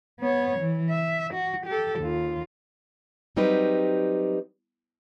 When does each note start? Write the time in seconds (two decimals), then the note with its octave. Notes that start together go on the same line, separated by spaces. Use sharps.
0.20 B3 C#5
0.59 E3
0.90 E5
1.34 F#4
1.66 G4 A4
2.00 D#2 F4
3.36 F#3 G3 C4 D#4 G4 B4